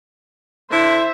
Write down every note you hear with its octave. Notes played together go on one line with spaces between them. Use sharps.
D3 E4 C5 E5